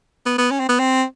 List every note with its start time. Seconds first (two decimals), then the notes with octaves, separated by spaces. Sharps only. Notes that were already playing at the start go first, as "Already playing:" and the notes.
0.26 B3
0.38 B3
0.51 C#4
0.60 C4
0.69 B3
0.79 C4